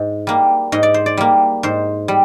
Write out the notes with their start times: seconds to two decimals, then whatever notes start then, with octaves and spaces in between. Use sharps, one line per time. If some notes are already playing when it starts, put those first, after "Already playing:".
Already playing: G#2
0.27 G3 A#3
0.72 G#2 D#5
0.83 D5
0.94 C5
1.06 D5
1.17 G3 A#3
1.63 G#2 C5
2.08 G3